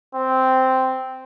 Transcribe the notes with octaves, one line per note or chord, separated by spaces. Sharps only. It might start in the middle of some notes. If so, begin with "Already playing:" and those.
C4